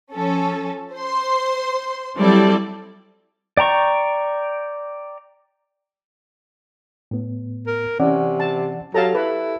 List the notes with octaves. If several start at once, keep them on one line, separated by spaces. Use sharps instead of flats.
F3 C#4 A4
C5 C6
F#3 G3 C4 E4 A4 D5
D5 G5 A#5 C#6
A2 B3
A#4
C3 E3 C#4 D5 F#5
A5
F#3 G4 A4 F5 A5 A#5
E4 B4